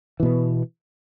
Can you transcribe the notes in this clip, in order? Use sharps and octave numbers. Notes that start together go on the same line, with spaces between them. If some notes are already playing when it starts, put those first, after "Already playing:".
B2 E3 B3